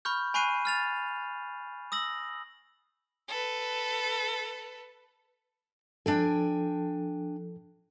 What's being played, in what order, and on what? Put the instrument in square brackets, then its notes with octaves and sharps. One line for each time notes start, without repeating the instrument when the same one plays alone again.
[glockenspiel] B5 C#6 F6 G6
G#5 B5 C#6 F#6 C7 D#7
F6 A6 F7
D#6 E6 A#6 F#7
[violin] A4 B4
[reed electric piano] F3 A4 [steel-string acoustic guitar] D4 G5 G#5